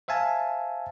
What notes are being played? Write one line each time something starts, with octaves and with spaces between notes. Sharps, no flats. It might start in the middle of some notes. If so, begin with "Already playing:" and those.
C5 E5 F5 G#5 A5